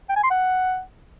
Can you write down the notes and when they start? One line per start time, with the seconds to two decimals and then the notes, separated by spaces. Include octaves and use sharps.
0.09 G5
0.16 G#5
0.23 C6
0.30 F#5